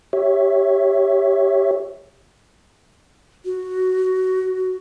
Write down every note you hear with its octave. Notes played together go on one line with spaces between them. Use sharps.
G4 C#5 E5
F#4